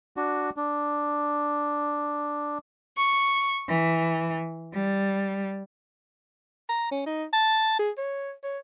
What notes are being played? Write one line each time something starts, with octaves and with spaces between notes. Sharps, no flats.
D4 F#4
D4
C#6
E3
G3
A#5
C#4
D#4
A5
G#4
C#5
C#5